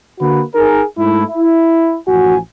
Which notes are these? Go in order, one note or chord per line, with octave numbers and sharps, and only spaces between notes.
D3 A#3 F#4 B4
D#4 G#4 A#4
G#2 A3 E4
E4
A1 F3 F#4 G#5